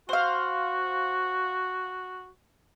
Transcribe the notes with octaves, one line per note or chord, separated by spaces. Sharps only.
F#4 C5 F5